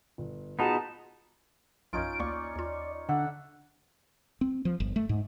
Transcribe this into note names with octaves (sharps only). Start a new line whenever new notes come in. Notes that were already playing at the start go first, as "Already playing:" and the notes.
G1
B3 D#4 F4 F#4 G#4 A5
A#1 F#2 C#4 D#4 F4 D7
D2 A#3 D5 C#6
D#2 F4
D3 E5 F#5
C4
F3
G1
A3
G#2